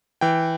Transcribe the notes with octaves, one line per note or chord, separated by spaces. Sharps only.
E3 G5